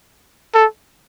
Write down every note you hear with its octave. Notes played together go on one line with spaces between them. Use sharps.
A4